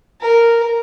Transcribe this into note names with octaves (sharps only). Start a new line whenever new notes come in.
A#4